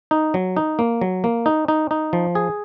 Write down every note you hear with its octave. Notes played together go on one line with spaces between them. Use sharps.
D#4
F#3
D#4
A#3
F#3
A#3
D#4
D#4
D#4
F3
G#4